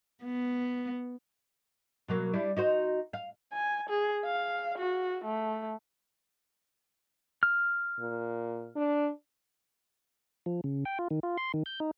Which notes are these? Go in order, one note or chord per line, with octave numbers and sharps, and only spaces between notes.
B3
B2 F#3 A#3
G3 D4 E4
D#4 F#4 C5
F5
G#5
G#4
F5
F#4
A3
F6
A#2
D4
F3
C#3
G5
F4
D#3
F4
C6
D#3
G6
D#4